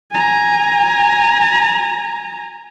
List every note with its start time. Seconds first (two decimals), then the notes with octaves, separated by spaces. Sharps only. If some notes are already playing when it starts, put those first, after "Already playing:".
0.11 G#5 A#5